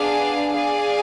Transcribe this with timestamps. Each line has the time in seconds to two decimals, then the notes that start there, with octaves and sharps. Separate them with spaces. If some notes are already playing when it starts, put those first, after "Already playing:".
Already playing: B3 D4 G#4 D5 F5
0.54 G#4 D5 F5